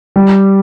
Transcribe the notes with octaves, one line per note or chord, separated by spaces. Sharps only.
G3